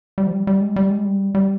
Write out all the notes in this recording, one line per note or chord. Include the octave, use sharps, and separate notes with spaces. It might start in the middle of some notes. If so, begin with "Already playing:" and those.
G3
F3
G3
G3
G#3
G3
G#3
G3
G3